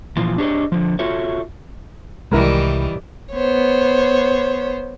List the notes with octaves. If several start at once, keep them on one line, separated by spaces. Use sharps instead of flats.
A#2 E3 F3 F4
D4 G4 G#4 C5 C#5 D#5
D3 F3
F4 F#4 A4 C#5 E5
C2 D#3 E3 G3 G#3 E4 A#4 B4
B3 C5 C#5